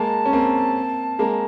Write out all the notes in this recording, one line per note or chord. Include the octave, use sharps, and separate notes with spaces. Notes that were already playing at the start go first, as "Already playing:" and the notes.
Already playing: G#3 A#3 A5
C#4
A#3 C4
G#3 A#3